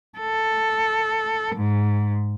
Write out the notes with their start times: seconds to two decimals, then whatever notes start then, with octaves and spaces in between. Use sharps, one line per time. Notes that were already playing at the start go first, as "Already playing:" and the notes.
0.19 A4
1.55 G#2